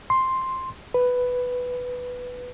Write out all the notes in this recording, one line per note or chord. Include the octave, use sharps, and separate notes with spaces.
C6
B4